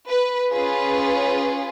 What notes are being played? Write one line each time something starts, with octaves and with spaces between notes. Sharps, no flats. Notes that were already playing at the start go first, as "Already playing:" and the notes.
B4
C#4 F4 G#4 B4